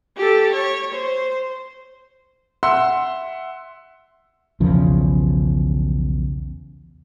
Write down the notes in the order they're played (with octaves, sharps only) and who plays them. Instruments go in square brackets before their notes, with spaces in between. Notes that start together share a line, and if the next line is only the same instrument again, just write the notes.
[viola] G4 A4
C#5
C5
[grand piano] E5 F#5 C6 E6
[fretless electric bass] B1 E2 C#3 F3